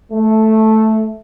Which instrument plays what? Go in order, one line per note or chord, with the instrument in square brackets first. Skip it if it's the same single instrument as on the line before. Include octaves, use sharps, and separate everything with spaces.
[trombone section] A3